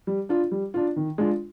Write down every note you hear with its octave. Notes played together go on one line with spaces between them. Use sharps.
G3
D4 F4
G3
D4 F4
D#3
G#3 D4 F4